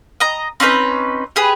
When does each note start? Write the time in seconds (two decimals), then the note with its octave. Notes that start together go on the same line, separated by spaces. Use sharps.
0.20 D#5 A#5
0.60 C4 C#4 D#4 B4
1.36 G4 G#4 B4